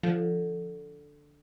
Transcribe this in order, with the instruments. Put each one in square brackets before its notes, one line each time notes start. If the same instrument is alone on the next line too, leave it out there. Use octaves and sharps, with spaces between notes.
[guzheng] D3 [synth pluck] F3